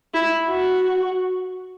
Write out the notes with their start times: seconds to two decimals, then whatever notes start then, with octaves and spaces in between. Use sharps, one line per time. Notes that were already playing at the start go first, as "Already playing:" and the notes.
0.14 E4
0.49 F#4